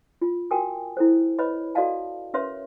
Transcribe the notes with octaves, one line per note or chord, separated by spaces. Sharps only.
F4
F#4 A#4 G5 G#5 D#6
E4 A4 C5
B4 C#5 D#5 B5
F#4 A4 D5 D#5 F5 A5
C#4 A#4 B4 C#5 E5 C6